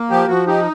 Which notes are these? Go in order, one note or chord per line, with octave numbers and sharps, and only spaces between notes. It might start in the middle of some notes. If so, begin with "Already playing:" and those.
Already playing: A#3
F3 G4
F3 F#4
D#4 G4